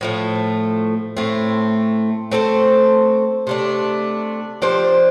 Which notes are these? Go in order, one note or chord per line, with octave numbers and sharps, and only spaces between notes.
A2 F3 A3
A2 A3 C4
A3 C4 A4 C5
C3 A3 D4
F3 D4 G4 C5